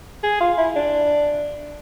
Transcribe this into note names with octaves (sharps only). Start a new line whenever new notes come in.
G#4
F4
E4
D4